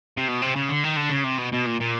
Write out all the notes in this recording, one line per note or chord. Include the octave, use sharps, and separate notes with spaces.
C3
B2
C3
C#3
D3
D#3
D3
C#3
C3
B2
B2
A#2
A#2